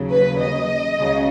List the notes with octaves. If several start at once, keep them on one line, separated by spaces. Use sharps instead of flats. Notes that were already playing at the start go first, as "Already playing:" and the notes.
Already playing: D#2 C#3 F#3
B4
D#5
C#2 C#3 F#3